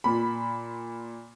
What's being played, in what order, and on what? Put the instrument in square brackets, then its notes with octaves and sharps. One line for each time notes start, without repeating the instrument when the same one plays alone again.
[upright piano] A#2 B5